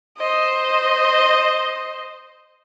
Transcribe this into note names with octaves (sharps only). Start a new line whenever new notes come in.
C5 D#5